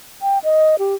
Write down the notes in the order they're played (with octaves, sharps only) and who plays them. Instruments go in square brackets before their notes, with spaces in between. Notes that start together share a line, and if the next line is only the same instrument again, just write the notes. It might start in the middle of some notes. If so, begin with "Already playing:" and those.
[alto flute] G5
D#5
G4